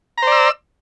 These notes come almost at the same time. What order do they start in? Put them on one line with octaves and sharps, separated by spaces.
A#5 C5 D5 E6